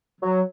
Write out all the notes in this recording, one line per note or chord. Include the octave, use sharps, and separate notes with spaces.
F#3